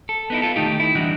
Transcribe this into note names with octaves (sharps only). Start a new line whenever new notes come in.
A4
B3 D#4 E4
F4 A4
D#3 A3 D#4 G4
E4
E3 G3 D4 D#4 F#4